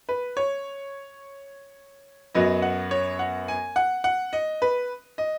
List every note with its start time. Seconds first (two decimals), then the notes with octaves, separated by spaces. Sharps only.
0.09 B4
0.37 C#5
2.35 F#2 F#3 B3 D#5
2.62 F#5
2.91 C#5
3.19 F#5
3.48 G#5
3.76 F#5
4.04 F#5
4.33 D#5
4.62 B4
5.18 D#5